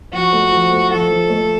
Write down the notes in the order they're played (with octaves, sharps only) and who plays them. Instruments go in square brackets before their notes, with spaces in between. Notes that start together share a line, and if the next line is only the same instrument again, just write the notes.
[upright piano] F3 [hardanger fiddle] F#4
[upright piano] A3
F3
A3
[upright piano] F3 [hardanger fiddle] A4
[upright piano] F3
A3